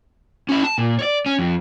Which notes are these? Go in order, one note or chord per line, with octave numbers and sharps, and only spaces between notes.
C#4 E4
A5
A#2
C#5 D5
C#4
F2